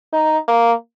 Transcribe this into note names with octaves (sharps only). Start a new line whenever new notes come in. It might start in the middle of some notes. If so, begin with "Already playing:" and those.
D#4
A#3